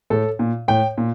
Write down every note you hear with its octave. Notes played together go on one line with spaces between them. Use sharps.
A2 A4
A#2
A2 G5
A#2